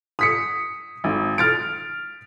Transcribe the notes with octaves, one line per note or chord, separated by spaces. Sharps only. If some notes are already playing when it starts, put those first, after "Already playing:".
D#6 B6 C#7
G#1
F6 A6 D7